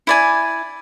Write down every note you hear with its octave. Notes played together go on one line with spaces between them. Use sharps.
E4 D5 G#5